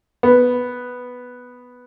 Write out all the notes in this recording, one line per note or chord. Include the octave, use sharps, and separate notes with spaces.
B3